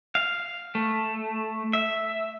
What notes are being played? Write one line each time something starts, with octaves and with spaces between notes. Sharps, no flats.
F5
A3
E5